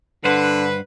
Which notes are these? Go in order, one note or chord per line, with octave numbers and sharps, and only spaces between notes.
G2 D3 B4 C5 F#5